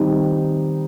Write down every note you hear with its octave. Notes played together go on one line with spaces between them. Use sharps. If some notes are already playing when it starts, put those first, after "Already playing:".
Already playing: D#3 G3 C4 D#4